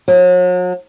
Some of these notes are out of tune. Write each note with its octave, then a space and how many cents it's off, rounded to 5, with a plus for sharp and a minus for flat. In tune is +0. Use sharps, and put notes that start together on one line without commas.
F#3 -40